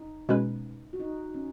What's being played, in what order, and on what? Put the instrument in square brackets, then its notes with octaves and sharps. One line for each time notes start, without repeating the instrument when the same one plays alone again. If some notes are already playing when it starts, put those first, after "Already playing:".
Already playing: [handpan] D#4
[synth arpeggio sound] B2 G#3 C#4 B4
[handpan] F#4
D#4
C#4